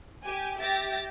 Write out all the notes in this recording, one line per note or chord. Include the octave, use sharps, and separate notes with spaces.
G4 G#5
G4 E5 A6 A#6